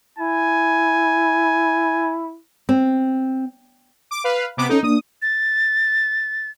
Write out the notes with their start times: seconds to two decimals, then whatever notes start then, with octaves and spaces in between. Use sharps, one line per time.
0.18 E4 G#5
2.69 C4
4.11 D6
4.24 B4 F5
4.57 C3 B3 D6
4.69 C#4 D#4 A4
4.83 A#3 D4 D#6
5.22 A6